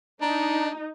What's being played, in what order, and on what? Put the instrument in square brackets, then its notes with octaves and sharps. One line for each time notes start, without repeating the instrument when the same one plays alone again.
[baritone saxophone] D4 [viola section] D#4 [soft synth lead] A#5